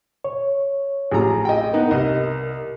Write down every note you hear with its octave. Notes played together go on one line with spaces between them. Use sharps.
C#5
A1 F3 G#4 A#5
D#5 G5
B3 D#4 A#4 F#5
C2 D#5